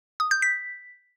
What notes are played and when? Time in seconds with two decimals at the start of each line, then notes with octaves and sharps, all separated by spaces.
0.20 D#6
0.31 G6
0.42 B6